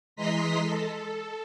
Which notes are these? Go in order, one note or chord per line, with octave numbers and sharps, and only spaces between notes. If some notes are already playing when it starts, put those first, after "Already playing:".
E3 G#3 D#5 A#5 C6 B6
A4